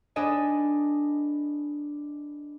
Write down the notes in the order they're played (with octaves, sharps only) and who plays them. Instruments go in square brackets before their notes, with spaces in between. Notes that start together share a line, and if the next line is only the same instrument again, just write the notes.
[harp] D4 A4 B4 D#5 G#5